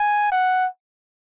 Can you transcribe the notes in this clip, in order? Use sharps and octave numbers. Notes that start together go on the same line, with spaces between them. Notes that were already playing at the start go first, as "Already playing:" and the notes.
Already playing: G#5
F#5